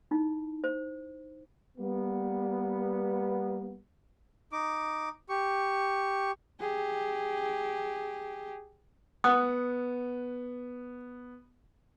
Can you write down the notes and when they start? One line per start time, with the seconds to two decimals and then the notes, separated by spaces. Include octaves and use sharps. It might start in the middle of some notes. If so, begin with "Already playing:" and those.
0.11 D#4 E4
0.64 C5
1.78 G3 A#3 B3
4.52 D#4 D6
5.29 G4 C#6
6.60 G4 G#4
9.24 B3 F#5 D#6